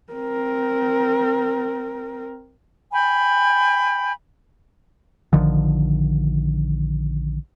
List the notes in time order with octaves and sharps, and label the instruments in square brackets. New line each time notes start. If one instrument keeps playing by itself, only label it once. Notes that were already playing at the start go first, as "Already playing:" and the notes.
[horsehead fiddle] C4 A#4
[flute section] G5 G#5 B5
[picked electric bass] A#1 D3 D#3 F3